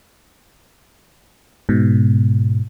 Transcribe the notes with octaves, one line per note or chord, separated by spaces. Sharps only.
G#2 B2